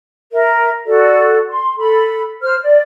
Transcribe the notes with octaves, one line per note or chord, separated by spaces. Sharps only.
A#4 E5
F#4 A4 D5
C6
A4 B5
C5 F6
D5